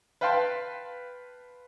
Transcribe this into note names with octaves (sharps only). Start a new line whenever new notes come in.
B4 F5 G5 A5 C6